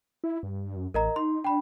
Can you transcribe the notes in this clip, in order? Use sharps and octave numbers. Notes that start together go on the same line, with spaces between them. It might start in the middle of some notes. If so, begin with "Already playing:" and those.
E4
G2
F#2
A1 A#4 D#5 A#5
D#4 C6
D4 G5 B5